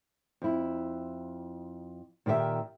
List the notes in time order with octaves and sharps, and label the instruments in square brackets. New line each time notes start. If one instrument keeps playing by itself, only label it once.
[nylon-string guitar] F2 E4
A#2 D#3 G4 C5 E5